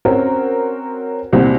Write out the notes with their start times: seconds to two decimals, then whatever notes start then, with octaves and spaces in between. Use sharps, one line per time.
0.05 C4 C#4 F#4 A#4
1.33 C2 A#2 C4 F#4